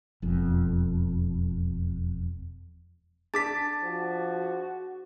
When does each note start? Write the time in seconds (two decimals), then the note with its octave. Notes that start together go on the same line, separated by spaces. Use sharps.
0.22 E1 F2
3.34 D4 G#4 A5 D6 A6 B6
3.83 F3 F#4